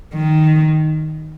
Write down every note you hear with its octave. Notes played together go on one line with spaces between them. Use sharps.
D#3